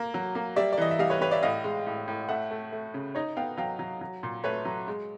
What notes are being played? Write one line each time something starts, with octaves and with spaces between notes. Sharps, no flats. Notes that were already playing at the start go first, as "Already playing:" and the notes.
Already playing: A#3
F#3
A#3
G3 D5 E5
D5
E3 D#5
E5
G3 D#5 F5
B4 C#5
G3 B4 C#5
D5 E5
A2 D#5 F5
G#3
A2
A2
A3 E5 F#5
A3
A3
C#3
D#4 C#5 D#5
B3 F5 G5
F#3 F5 G5
F#3
F#3
A#2
A3 B4 C#5
F#3
G#3